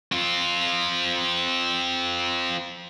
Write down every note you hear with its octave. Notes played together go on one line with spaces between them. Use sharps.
C4 F4